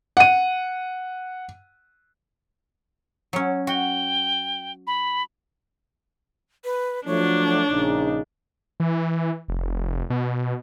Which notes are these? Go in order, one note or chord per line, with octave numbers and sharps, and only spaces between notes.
F#5 D#7
F#3 C#4
F#4 G5
B5
B4
F3 F#3 A3 D4 C#5
A#1 C#3 D#4
E3
F1
B2